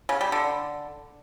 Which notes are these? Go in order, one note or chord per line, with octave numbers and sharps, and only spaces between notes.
C#3
G3
D3